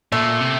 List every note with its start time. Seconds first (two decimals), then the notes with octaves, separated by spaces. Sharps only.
0.12 A#2 A3
0.41 C3